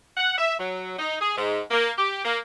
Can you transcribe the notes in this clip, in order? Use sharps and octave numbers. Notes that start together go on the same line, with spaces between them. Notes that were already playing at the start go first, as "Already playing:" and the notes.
F#5
E5
F#3
D#4
G#4
G#2
A#3
G4
A#3